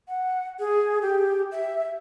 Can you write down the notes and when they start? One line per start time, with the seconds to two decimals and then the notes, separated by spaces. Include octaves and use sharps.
0.08 F#5
0.59 G#4
1.02 G4
1.52 E5